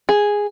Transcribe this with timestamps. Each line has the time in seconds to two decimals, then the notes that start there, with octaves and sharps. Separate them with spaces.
0.09 G#4